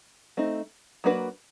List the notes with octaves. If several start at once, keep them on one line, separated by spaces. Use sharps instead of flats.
A3 C4 D#4
F#3 A#3 D4 F#4 B4